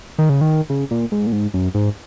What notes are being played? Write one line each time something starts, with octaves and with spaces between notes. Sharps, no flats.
D#3
C#3
D#3
C#3
A#2
G#2
A#2
G#2
F#2
G#2